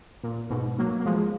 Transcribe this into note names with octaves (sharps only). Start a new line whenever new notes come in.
A#2
G#2 B2
F#3 A#3
A#3
F3 G#3